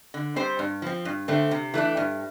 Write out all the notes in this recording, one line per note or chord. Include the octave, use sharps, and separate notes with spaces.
D3
G3 C4 G4 C5
G2
F3 C4
G2
D3 A3 C4
C3
E3 A3 D4
G2